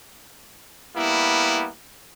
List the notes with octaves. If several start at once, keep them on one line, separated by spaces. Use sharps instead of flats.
G3 A#3 B3 E4